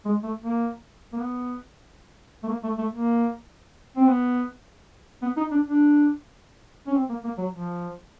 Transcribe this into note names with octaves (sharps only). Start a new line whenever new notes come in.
G#3
A3
A#3
A#3
B3
A3
A#3
A3
A3
A#3
C4
B3
B3
D#4
D4
D4
C#4
C4
A#3
A#3
F#3
F3